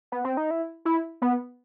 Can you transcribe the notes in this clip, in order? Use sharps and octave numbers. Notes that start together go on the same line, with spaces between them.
B3
C4
D#4
E4
E4
B3